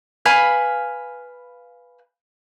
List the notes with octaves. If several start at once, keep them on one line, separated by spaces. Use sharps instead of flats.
B4 F5 G#5 B5